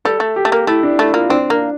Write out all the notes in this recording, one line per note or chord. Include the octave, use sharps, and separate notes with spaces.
G3 A4
A3
G4
A3
A#3
A3 E4
D4
A3 E4
A#3 F4
C4 D4
A#3 D4